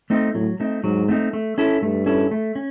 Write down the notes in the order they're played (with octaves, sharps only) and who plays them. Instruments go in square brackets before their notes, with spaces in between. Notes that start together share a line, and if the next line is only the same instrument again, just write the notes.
[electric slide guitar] A3 C4 D#4
[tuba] A2 [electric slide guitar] F#3
[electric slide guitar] A3 C4 D#4
[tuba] G#2 [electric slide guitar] F#3
[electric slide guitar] A3 C4 D#4
A3
C#4 E4 A4
[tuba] G2 [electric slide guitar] A3
[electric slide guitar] C#4 E4 A4
A3
C#4